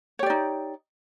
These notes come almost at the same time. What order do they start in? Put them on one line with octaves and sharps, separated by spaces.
C#5 G4 D5 D#4